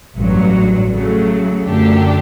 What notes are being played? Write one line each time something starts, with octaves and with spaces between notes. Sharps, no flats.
A1 G2 F#3
C#3 F#3 A3
F#2 D3 A3 D4 G4